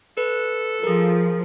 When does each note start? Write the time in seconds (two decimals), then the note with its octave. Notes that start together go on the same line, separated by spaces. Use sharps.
0.17 A4 B4
0.83 F3 G#4 A#4